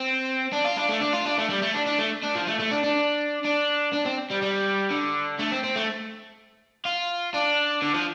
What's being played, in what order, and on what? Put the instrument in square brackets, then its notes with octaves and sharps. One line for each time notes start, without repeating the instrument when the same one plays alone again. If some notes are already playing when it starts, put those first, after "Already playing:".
Already playing: [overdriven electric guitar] C4
D4
F4
D4
A3
D4
F4
D4
A3
G3
A3
D4
D4
A3
D4
F3
A3
A3
D4
D4
D4
D4
C4
G3
G3
D3
A3
C4
C4
A3
F4
D4
D3
F3